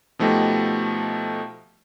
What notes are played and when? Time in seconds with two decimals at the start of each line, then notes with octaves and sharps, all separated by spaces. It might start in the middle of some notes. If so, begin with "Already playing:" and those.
0.19 B2 F3 A3 D#4 G4